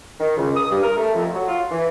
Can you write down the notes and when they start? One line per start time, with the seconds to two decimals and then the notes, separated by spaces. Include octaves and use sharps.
0.19 D#3
0.36 C#2
0.56 D#6
0.71 G2
0.82 A#4
0.97 A3
1.14 F2
1.34 F#3
1.48 F4
1.70 E3